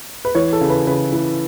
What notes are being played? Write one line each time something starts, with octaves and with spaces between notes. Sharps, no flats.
B4
E3 C#5
A4
C#3
B4
C#3 B4
E3